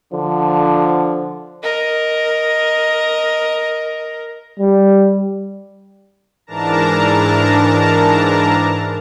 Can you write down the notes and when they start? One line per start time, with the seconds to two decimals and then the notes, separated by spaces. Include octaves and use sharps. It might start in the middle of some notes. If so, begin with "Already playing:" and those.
0.13 D3 F3
1.63 A#4 D#5
4.59 G3
6.47 G#2 E3 D4 A#4 A5 A#5